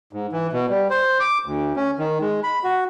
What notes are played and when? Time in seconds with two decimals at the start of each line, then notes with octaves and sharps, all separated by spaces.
0.13 G#2
0.32 E3
0.53 B2
0.69 G3
0.90 C5
1.20 D6
1.46 D2
1.76 C#4
1.99 D#3
2.21 G#3
2.44 B5
2.64 F#4